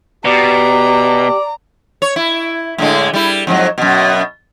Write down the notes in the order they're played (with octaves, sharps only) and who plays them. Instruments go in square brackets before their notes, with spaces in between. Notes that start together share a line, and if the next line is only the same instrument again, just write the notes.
[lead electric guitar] B2 [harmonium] G4 [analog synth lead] D5 [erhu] A#5
[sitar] C#5
E4
A2 D3 G#3
G3 E4
F2 G#2 F#3
F#2 B2